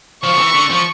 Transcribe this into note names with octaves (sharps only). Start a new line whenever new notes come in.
F3 C#6
F3
E3
D3
F3